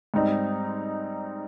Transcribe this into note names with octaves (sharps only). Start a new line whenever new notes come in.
G#2 G3 C4 D#4